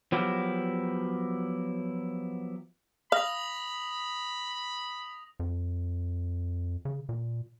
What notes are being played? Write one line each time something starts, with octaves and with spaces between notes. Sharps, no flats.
F3 F#3 B3 E4 G4 A#4
F5 B5 D#6 A#6 F7
F2
C#3
A#2